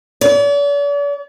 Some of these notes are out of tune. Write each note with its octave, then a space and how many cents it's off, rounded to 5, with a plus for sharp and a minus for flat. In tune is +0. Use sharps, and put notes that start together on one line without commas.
D5 -45